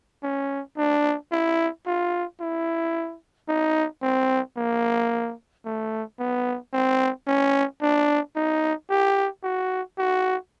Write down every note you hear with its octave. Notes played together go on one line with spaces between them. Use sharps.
C#4
D4
E4
F4
E4
D#4
C4
A#3
A3
B3
C4
C#4
D4
D#4
G4
F#4
F#4